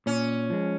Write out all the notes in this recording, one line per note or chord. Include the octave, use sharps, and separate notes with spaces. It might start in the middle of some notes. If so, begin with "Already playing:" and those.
A#2 C#4
F3 G#3